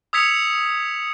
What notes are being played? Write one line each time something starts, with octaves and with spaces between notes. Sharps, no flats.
D#6 E6 G#6 B6 C#7 F7